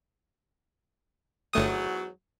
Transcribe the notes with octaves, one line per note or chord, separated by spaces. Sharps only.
G1 E2 G#2 F#3 A3 D#6